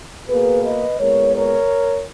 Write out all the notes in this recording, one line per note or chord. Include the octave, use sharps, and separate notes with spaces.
B2 A#3 G#4 B4
B4 D#5
A#2 G#3 B3 A#4 C#5
A#4 C#5